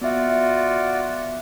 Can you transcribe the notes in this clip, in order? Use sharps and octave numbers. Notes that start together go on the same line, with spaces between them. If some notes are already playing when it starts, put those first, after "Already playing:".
B3 F4 F#4 D5 E5